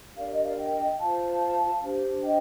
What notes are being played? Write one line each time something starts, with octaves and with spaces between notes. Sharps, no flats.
D4 G4 A#4 D5 F5
D#5
D5 F5
D#5 G5
F4 C5 F5 A5
D4 G4 C5
D#5 G5